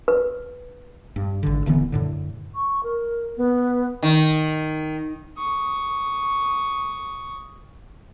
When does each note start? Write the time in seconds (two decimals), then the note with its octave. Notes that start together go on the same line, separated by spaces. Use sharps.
0.08 B4
1.16 G2
1.43 G#1 D3
1.66 D#1 D3 E3 B3
1.92 F#2 A2 D3
2.55 C#6
2.83 A#4
3.37 B3
4.03 D#3
5.38 C#6 D#6